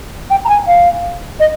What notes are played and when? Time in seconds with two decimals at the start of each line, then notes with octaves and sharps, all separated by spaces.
0.30 G5
0.44 A#5
0.48 G#5
0.67 F5
1.39 D#5